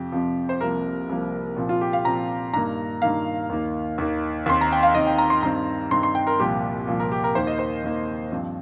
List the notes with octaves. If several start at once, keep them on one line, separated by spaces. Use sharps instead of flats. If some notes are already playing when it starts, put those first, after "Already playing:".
Already playing: F2 C3 F3 G4
F2 C3 F3
C5
C2 C3 F3 A#3 A#4
C2 C3 F3 A#3
A#2 F3 C4
F4
G4
F5
A#2 F3 C4 A#5
G2 D#3 A#3 A#5
G2 D#3 A#3 F5
D#2 D#3 A#3
D#2 D#3 A#3
D#2 D#3 C4 C6
A#5
G5
F5
D#2 D#3 C4 D#5
G5
A#5
C6
G2 D#3 C4 A#5
G2 D#3 C4 C6
C6
G5
A#4
C2 A#2 F3 A#3 G4
C2 A#2 F3 A#3
A#4
G4
A#4
D#2 D#3 A#3 C5
D#5
C5
D#2 D#3 A#3
G2 F3 C4